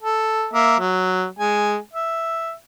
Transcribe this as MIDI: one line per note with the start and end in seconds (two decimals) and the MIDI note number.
0.03 0.48 69
0.54 0.77 58
0.54 0.77 76
0.79 1.25 54
1.39 1.77 56
1.39 1.77 80
1.94 2.52 76